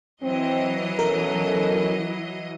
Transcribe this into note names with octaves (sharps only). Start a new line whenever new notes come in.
E3 F#3 C4 D#5
B2 C#4 A4 A#4